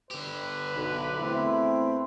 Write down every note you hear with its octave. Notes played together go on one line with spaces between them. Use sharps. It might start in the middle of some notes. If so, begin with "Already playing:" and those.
D3 G4 B4
B1
E2 A3 C4 E4